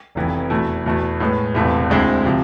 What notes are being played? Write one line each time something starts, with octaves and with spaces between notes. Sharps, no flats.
F1 F2 E3 B3 E4
E2 B2 A3 E4
E2 B2 A3 E4
A2 G#3 B3
E1 E2 C3 E3 A3
D2 D3 G#3 C4 E4
C3 F3